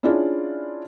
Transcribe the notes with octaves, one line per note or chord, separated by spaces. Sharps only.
C#4 D4 E4 F4 G#4 D5